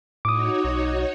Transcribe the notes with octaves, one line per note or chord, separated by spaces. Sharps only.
A2 D#4 F#4 C#5 D6 D#6
B1